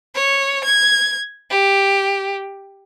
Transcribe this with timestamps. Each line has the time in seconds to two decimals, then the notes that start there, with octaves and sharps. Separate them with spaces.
0.15 C#5
0.65 G#6
1.50 G4